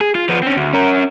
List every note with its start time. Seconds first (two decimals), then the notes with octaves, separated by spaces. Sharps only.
0.01 G#4
0.15 F4
0.29 F3 B3
0.43 C4 C#4
0.57 D2
0.73 C#4 A#4